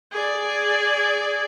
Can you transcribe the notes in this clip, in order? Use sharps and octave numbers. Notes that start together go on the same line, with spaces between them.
G#4 D5